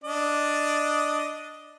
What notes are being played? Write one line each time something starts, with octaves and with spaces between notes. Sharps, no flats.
D4 D#5